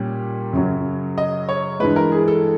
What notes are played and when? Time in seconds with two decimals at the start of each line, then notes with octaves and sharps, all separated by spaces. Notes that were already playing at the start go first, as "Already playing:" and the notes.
Already playing: A#2 G3 A#3 C#4
0.53 F#2 C#3 F#3
1.18 D#5
1.49 C#5
1.80 G2 E3 G#3 B4
1.96 A#4
2.12 G#4
2.28 A4